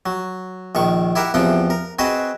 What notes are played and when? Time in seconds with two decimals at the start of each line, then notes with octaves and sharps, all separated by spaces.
0.06 F#3
0.75 A#1 D#3 C#6
1.16 E4 G4 A#4 E5 F#5
1.34 E2 C3 F3 C4 F#5 G5
1.70 A#4
1.99 C4 F#4 G#4 B4 C5 D#5